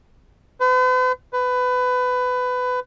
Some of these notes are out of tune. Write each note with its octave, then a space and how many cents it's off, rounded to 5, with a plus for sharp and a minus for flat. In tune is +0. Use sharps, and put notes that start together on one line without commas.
B4 +45
B4 +20